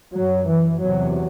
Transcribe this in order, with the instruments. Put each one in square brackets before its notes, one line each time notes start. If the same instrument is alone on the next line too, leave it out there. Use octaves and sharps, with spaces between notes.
[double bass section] F#2 F#3
E3
E2 C3 F#3